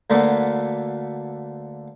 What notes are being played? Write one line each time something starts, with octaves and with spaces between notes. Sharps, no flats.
D2 D3 A#3 B3